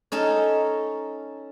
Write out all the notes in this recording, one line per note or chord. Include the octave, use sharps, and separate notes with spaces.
C#4 D#4 A4 A5